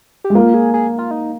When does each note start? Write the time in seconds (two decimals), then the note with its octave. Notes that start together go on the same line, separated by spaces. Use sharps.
0.24 G4
0.30 G#3
0.35 A#3 F4
0.54 G#4
0.74 G#4
0.99 F4
1.11 D#4